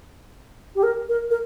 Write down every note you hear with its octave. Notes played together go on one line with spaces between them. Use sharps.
G4
A#4
A#4
A#4